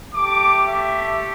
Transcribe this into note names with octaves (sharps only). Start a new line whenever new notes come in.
A3 G4 D6
E5